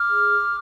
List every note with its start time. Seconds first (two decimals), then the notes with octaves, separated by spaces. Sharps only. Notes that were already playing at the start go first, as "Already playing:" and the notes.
Already playing: D6 F6
0.09 G#4